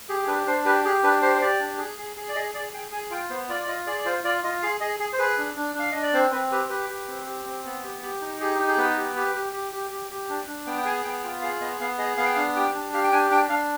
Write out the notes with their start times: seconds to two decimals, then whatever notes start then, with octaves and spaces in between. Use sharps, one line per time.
0.09 G4 G#4
0.23 G#4
0.27 D4 B4
0.47 D4 C5
0.65 G4 B4
0.84 G4 G#4
1.04 D4 B4
1.22 G4 C5
1.35 C5
1.41 G4 D5
1.60 D4
1.78 G#4
1.98 G#4
2.17 G#4
2.29 D5
2.35 G#4 D#5
2.54 G#4 D5
2.73 G#4 G5
2.92 G#4 G#5
3.11 F4 G5
3.30 B3 C5
3.49 F4 D5
3.60 D5
3.68 F4 D#5
3.87 G#4 D5
3.98 D5
4.05 F4 C5
4.24 F4 D5
4.44 F4 D#5
4.62 G#4 F5
4.81 G#4 D#5
4.99 G#4
5.13 C5
5.18 G#4 B4
5.38 D4
5.56 D4
5.75 D4 F5
5.92 D4 D#5
6.02 D5
6.13 C4 C5
6.32 C4 B4
6.52 G4 B4
6.70 G4 B4
6.90 G4
7.08 C4
7.26 G4
7.45 C4
7.65 B3
7.84 G4
8.02 G4
8.21 D#4
8.40 G4 G#4
8.59 D#4
8.68 G#4
8.77 B3 B4
8.97 G4
9.16 G4
9.35 G4
9.53 G4
9.73 G4
9.91 G4
10.11 G4
10.29 D4
10.47 D4
10.66 B3 G5
10.78 G5
10.85 G#4 G#5
11.04 B3 G5
11.23 F4 G5
11.42 G#4 F5
11.61 B3 D#5
11.80 B3 F5
11.99 G#4 D#5
12.17 B3 F5
12.26 G5
12.34 D4 F5
12.56 G4 G5
12.74 D4
12.93 G4 F5
13.04 G5
13.13 D4 G#5
13.31 D4 G5
13.50 D4 F5